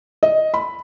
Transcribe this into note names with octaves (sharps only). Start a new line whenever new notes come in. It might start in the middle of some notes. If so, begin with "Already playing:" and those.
D#5
B5